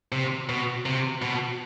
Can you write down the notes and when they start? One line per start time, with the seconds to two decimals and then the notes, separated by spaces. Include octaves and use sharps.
0.12 C3
0.49 B2
0.86 C3
1.22 B2